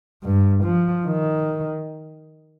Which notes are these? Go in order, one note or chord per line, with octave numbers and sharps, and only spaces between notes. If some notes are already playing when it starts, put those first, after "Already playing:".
G2
F3
D#3